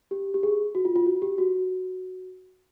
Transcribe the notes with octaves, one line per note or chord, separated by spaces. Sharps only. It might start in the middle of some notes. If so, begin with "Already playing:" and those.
G4
G4
G#4
F#4
F4
F4
F#4
G4
F#4